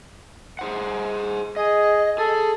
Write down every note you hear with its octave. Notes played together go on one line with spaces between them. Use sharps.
G#4 C5 F#5
G#4 D#5
G#4 A4